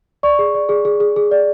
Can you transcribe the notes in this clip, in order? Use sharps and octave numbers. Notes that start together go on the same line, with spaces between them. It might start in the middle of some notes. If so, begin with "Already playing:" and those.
D5 C#6
G#4
D5
G#4
G#4
G#4
G#4
D5